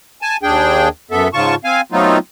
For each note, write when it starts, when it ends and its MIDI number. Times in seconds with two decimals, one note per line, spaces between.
0.22 0.37 80
0.22 0.37 81
0.43 0.88 39
0.43 0.88 62
0.43 0.88 68
0.43 0.88 79
1.11 1.28 42
1.11 1.28 59
1.11 1.28 69
1.11 1.28 76
1.33 1.55 44
1.33 1.55 49
1.33 1.55 65
1.33 1.55 81
1.33 1.55 85
1.64 1.81 60
1.64 1.81 77
1.64 1.81 80
1.92 2.18 54
1.92 2.18 57
1.92 2.18 59
1.92 2.18 60
1.92 2.18 63
1.92 2.18 65